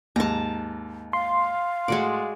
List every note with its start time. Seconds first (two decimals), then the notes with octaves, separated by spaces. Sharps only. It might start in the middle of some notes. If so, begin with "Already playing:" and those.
0.16 D#2 G#2 A5 A#5
1.13 F5 C6
1.88 A2 G#3 F#4 D5